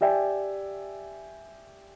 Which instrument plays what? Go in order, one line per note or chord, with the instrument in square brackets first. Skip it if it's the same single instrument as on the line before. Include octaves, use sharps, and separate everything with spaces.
[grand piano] G4 D5 E5 G5 G#5